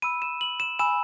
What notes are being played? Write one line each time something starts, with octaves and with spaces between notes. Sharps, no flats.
B5 E6 D#7
E7
F#7
E7
G#5 B5 E6 E7